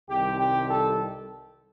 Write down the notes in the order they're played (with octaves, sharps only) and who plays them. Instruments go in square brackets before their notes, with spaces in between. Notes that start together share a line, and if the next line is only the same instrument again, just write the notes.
[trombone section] C2 C3 D#3 G3 G4
G4
A4